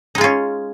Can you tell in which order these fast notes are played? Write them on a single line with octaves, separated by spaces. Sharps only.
D#4 G#3 F4 C#4